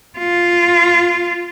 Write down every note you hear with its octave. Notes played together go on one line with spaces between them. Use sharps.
F4